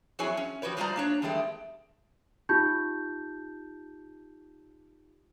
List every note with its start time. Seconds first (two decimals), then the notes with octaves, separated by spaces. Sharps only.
0.19 F2 F#3 E4 G#4 C#5 G#5
0.37 C#4
0.62 F3 F#4 G4 B4 C#5
0.77 G3 G#3 F4 C5 D5 A#5
0.96 A#3 D4 C#5
1.22 E2 G2 G#3 A3 G4
2.49 D#4 F4 G4 A5 G6